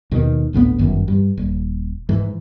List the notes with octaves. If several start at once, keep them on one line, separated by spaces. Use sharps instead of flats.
D#2 B2 D#3
G#1 D2 A2 B3
G1 F#2 D#3 E3
G2
D#1
G#2 E3